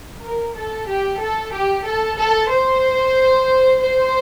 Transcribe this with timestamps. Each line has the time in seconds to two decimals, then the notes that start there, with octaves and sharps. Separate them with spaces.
0.24 A#4
0.56 A4
0.89 G4
1.21 A4
1.54 G4
1.86 A4
2.18 A4
2.51 C5
3.81 C5